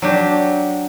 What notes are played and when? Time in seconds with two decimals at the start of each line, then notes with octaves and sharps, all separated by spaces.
0.02 F#3 D4 G4